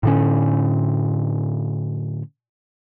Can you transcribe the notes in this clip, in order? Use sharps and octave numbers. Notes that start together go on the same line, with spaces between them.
A2 D3 C#4